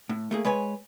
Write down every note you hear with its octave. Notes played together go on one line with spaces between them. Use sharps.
A2
A3 A#3 G#4
G#3 B4 C#5 G#5